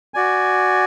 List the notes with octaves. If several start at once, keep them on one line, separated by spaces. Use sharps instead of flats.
F#4 D5 G#5